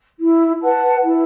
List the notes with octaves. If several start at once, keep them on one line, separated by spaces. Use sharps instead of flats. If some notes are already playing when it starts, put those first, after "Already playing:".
E4
B4 F#5 A5
E4